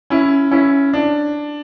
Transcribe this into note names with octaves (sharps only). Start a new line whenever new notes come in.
C#4 E4
C#4 E4
D4